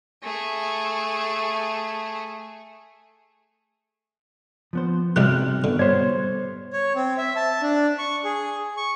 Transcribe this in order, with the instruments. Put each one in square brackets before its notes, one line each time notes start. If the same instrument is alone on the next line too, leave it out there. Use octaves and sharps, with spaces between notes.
[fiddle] A3 G#4
[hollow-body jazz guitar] F3 B3 C5
[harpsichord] G#2 G3 G4 [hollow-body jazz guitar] C3 F#4 [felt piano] F6 F#6
[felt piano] B2 [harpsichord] D3
[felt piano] B2 C#5 [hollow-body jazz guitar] G3 B3 [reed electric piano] C5 G#6
[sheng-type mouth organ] C#5
C4
E5
A5
D4
C#6
G#4
C#6